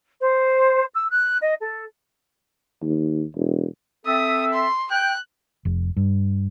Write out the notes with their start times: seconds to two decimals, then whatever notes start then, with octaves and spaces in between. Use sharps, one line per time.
0.21 C5
0.94 E6
1.10 F#6
1.42 D#5
1.61 A4
2.82 D#2
3.36 E1
4.06 C4 A4 E5 D#6
4.53 C6
4.91 G5 F#6
5.65 F1
5.97 G2